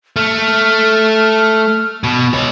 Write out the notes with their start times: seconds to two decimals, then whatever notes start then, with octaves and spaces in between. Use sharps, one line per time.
0.16 A3 F6
2.03 B2
2.34 C#5 D#5